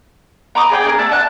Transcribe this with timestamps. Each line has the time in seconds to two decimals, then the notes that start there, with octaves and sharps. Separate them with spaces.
0.55 A#5 B5 D6 D#6
0.70 G#4 D5 G5
0.84 D4 G#4 A#4
0.98 A3 D4 A5
1.11 D5 A5 F#6